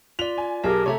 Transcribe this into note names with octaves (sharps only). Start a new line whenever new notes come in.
F4 D5 F7
G#5
B1 G4 G#4 A#4 A5
C3 A3 C#5 E5 A#5 C#6